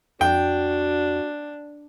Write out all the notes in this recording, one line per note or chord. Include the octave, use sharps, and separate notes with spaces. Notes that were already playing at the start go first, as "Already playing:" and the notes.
F2 D4 F#4 G5